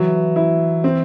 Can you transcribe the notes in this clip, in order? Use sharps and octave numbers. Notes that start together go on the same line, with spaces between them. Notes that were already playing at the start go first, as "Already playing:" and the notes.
Already playing: E3 F#3
E4
C4